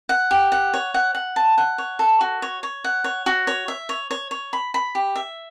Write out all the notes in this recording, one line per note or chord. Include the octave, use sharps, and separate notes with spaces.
F#5
G4
F#5
C#5
F#5
F#5
A5
F#5
C#5
A4
F#4
C#5
C#5
F#5
C#5
F#4
C#5
E5
C#5
C#5
C#5
B5
B5
G4
E5